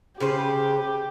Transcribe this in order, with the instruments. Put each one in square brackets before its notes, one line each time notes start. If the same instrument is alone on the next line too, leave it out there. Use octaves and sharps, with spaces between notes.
[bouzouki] C#3 B4 C5 [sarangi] G4